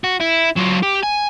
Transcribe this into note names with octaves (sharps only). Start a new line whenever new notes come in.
F#4
E4
F#3 F4
G4
G#5